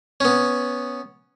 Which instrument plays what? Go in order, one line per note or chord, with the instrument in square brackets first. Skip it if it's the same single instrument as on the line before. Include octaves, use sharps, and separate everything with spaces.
[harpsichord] B3 C#4